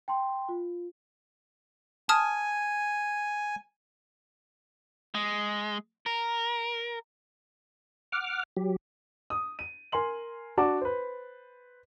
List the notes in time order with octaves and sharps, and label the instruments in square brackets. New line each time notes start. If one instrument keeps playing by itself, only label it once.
[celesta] G5 A5 C6
F4
[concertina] G#5 [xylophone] A5 D#6 F6
[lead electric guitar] G#3
A#4
[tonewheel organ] F#5 D6 F6
F#3 G4
[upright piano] D#6
D#7
A#4 G#5 C6 F#7
D4 F#4 D5 A5 D6
B4 C5